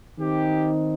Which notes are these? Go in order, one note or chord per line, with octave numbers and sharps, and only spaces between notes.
D#3 C4 D#4 G4